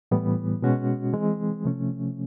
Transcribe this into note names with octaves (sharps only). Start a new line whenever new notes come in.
A2 E3 G3 B3
B2 G#3 C#4 F#4
E3 G#3 C4
C3 F3 A3 C#4